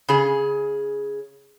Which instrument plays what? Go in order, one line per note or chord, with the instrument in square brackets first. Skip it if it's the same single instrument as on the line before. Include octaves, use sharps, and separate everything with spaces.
[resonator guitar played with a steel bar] C#3 G#4